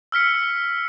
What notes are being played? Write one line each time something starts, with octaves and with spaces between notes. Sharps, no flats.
E6 F6 B6 C#7